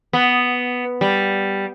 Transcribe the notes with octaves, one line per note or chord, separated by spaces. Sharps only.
B3
G3